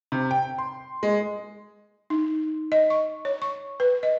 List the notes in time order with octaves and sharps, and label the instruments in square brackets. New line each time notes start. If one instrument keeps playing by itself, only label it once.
[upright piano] C3
G5
C6
G#3
[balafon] D#4
D#5
C#6
C#5
C#6
B4
D#5